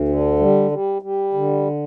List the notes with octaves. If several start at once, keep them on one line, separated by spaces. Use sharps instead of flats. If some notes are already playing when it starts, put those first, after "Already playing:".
Already playing: D2
D3
G3
G3
G3
D3